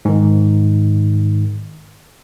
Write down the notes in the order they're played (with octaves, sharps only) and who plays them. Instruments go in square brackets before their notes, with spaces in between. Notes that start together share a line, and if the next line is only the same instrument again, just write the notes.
[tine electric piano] G#2 D#3